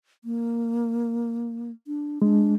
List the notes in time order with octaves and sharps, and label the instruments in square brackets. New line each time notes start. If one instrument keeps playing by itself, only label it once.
[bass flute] A#3
D4
[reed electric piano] G#3 [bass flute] D4